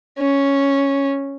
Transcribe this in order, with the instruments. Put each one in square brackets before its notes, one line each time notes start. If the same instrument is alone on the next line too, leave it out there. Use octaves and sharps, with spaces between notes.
[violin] C#4